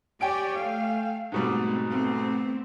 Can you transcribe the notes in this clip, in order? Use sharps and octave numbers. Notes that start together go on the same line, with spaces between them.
G4 C#5 D5 G5 G#5 D7
A3 F5
G#2 B2 G3 A3 C4
A3 B3 C4